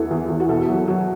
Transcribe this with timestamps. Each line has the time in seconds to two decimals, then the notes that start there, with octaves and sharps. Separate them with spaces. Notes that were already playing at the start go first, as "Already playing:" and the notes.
Already playing: E2 E3 B3 A4
0.11 E2
0.30 E2
0.40 F#4
0.49 B2 A4
0.68 F#3
0.88 F#3